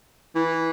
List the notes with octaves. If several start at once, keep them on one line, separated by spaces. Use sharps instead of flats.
E3